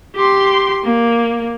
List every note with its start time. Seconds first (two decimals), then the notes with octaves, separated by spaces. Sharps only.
0.16 G4 C6
0.84 A#3